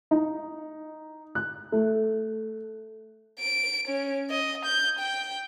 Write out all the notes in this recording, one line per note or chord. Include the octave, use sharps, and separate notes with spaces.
D#4
F#6
A3
D7
C#4
D#5
G6
G5